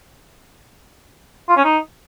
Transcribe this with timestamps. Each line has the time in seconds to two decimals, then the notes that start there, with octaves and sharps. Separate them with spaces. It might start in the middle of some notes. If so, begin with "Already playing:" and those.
1.49 F4
1.57 C#4
1.64 D#4